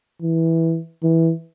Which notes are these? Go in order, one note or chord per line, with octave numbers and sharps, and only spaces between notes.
E3
E3